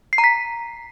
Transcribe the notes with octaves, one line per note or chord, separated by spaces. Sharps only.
C7
A#5
B6